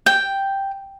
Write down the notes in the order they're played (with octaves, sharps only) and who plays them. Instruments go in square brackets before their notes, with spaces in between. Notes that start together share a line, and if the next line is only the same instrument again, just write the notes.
[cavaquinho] G5